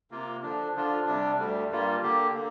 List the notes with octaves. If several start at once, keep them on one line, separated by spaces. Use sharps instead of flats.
C3 A#3 F4
D3 F3 D4
D3 F3 D4 F4
C3 G3 D4
D2 D3 G3
G2 G3 A#3 F4
D3 A#3 G4
D3 A#3